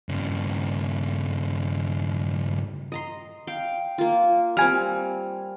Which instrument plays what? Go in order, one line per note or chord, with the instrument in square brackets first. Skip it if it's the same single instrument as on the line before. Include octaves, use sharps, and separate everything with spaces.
[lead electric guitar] G2 C#3
[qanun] D#5 A#5 C6
F5 G5
A#3 F4
[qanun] G3 C4 [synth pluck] G#5 F6